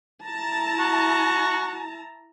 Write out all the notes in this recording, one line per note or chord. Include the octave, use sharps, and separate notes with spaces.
E4 A5 A#5
F#4